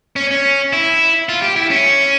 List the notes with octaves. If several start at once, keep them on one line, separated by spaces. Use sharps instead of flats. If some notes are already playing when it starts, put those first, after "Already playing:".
C#4
C#4
E4
F4
G4
E4
C#4